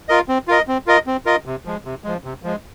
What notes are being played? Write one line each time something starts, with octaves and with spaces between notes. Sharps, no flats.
F4 A#4 D#5
C4
F4 A#4 D#5
C4
F4 A#4 D#5
C4
F4 A#4 D#5
C3
F3 G#3
C3
F3 G#3
C3
F3 G#3